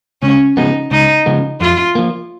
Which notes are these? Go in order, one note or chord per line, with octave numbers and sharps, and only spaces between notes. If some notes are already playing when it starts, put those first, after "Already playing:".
C#2 C#4
C#3 F3 G#3 B3 D#4
C#2 D#4
C#3 F3 G#3 B3
F2 F4
F3 A#3